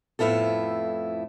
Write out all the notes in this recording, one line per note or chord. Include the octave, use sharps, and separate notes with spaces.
F2 A2 B3 E4 F4 A4